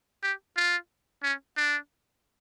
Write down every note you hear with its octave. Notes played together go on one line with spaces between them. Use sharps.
G4
F4
C#4
D4